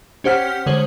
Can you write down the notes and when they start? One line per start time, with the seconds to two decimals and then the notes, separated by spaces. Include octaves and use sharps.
0.24 C#4 G4 C5 F#5 F6 B6
0.66 D3 G#3 G#4 C5 C#5 F#7